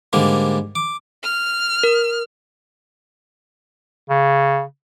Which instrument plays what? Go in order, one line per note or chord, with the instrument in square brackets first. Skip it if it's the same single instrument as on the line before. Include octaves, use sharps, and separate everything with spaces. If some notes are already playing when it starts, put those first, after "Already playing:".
[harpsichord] G#2 D3 G3 A#3
D6
[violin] F6
[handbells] A#4
[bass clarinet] C#3